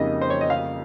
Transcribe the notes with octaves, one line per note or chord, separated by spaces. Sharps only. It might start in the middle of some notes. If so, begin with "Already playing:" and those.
Already playing: F2 C#3 G3 A#3 D#4 D#5
C5
C#5
D#5
F5